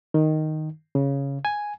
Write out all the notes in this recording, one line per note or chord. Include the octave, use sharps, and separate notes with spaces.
D#3
C#3
G#5